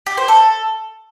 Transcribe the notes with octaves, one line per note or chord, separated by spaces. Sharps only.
G4
C5
A4